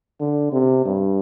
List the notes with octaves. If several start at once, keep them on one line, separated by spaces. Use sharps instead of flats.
D3
C3
G2